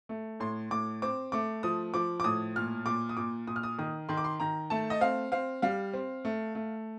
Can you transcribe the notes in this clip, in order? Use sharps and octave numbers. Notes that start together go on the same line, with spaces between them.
A3
A2 C6
A2 D6
C4 D6
A3 D6
F3 D#6
F3 D6
D6
A2 D#6
A#2 F6
A#2 D6
D#6
A#2 D6
A#2 D#6
F6
D#6
D#3 D#6
D#3 C6
D6
C6
D#3 A#5
A3 A5
D#5
C4 F5
C4 F5
G3 F5
C4
A3
A3